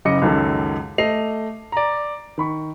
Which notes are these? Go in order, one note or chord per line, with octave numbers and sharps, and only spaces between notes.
F#1 C#3 D#5 D6 C#7
C#2 F#2 D#3 F#3 A4
A3 D#5 C7 F7
D5 A#5
D#3 B5 C#6